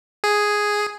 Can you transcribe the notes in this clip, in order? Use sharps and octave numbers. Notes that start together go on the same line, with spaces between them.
G#4